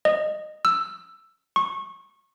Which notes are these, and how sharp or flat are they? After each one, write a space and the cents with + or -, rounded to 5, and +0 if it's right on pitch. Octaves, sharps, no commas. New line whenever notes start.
D#5 -20
E6 +10
C#6 -25